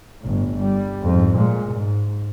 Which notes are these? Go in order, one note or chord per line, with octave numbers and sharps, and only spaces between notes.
G1 A2
G3
F2 G#2
A#2 G#3
G#2